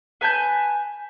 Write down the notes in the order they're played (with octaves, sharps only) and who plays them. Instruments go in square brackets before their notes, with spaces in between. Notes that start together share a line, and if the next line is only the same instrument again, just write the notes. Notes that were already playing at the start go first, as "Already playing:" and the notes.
[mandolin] B4 G#5 A5 G6